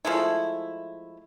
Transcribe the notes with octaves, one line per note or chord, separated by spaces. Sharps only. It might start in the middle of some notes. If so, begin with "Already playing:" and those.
F3 G#3 A3 E4